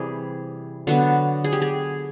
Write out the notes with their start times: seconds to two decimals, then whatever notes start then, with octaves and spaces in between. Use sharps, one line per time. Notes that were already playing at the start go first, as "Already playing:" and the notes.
Already playing: C3 E3 G3 G#4
0.87 D3 F#3 B3
1.44 G#4
1.53 G4
1.62 G#4